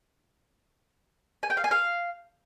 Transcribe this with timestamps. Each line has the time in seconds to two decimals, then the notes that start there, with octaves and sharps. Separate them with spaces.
1.43 G#5
1.50 G5
1.57 F5
1.64 G#5
1.71 F5